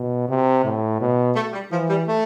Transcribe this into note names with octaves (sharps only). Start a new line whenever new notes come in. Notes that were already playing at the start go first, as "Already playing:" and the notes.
Already playing: B2
C3
A2
B2
A3
G3
E3 F3
G3
A3